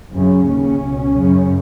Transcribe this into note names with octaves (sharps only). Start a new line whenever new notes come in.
F#2 C#3 C#4
D#2 C#3 C#4
C#2 B2
F#2 C#3